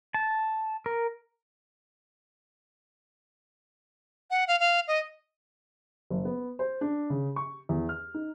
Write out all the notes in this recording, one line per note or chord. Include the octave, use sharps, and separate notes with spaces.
A5
A#4
F#5
F5
F5
D#5
F#1
B3
C5
D4
C#3
C#6
E2
F6
D#4